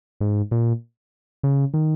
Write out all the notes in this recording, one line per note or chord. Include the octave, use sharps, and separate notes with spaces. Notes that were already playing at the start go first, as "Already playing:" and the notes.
G#2
A#2
C#3
D#3